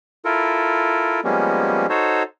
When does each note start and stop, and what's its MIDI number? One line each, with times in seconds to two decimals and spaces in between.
0.25 1.20 64
0.25 1.20 65
0.25 1.20 69
0.25 1.20 70
1.24 1.87 53
1.24 1.87 55
1.24 1.87 56
1.24 1.87 58
1.24 1.87 59
1.24 1.87 61
1.89 2.23 63
1.89 2.23 66
1.89 2.23 69
1.89 2.23 72
1.89 2.23 73